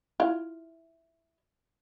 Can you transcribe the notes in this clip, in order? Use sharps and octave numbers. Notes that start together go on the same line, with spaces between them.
E4 F4